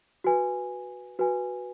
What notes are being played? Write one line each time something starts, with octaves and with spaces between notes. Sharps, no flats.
F#4 B4 G#5
F#4 B4 G#5